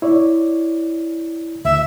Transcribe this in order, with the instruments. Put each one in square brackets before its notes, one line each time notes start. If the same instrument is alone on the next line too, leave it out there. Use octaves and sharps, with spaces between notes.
[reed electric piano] E4 C#5 D5
[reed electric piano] D2 [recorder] E5